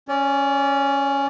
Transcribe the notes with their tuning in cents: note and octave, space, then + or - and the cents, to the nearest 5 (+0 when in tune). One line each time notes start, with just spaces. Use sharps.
C#4 +0 D5 -30